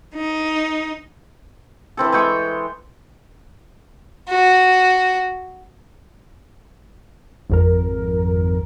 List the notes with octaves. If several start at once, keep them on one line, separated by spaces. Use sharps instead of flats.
D#4
E3 C4 A4
E3 G#3 G5 C#6
F#4
G#1 F2 A#4